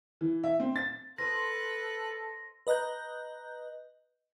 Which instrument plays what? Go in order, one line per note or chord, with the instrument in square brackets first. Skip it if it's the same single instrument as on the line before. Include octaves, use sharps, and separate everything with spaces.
[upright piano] E3
E5
C4
A6
[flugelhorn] A4 [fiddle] B4 F#6 [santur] C5 D#5 [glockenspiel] A#6
[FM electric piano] B4 D#5 A#5 F#6 G6